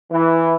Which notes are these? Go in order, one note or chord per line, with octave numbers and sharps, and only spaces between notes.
E3